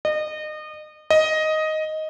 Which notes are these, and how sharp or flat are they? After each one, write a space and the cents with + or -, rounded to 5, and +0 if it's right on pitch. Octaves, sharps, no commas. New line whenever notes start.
D#5 -30
D#5 +5